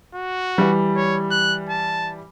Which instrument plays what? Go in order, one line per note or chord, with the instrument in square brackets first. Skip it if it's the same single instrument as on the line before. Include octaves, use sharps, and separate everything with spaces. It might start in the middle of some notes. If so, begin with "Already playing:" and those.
[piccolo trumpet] F#4
[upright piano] E3 G3
[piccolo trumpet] C#5
F#6
A5